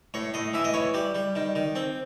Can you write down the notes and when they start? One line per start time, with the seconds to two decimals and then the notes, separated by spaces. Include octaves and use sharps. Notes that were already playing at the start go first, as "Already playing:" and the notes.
0.14 A2 C#5
0.34 A2 D#5
0.54 E3 E5
0.64 D#5
0.74 E3 C#5
0.94 G3 D5
1.15 G3
1.36 D#3
1.55 D#3
1.75 C4